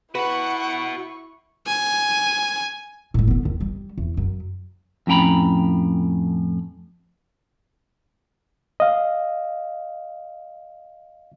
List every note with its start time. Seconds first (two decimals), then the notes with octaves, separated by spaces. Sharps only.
0.15 E4 F#4 B4 F#5 B5 C#6
1.67 G#5
3.14 A2 G3
3.28 D3 B3
3.45 D#2
3.60 G3
3.98 E2
4.17 F#2
5.07 F2 A2 C#4 G5 A#5 B5
8.80 D#5 F5